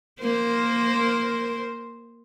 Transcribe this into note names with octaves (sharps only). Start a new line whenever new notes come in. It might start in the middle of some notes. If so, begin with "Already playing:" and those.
A#3 A#4 C5